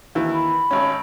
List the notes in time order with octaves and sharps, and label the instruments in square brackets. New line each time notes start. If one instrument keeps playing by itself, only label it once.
[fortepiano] D#2 E3
[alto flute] B5
[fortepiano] G#1 C#4